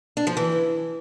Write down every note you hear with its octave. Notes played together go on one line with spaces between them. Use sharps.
D4
F3
E3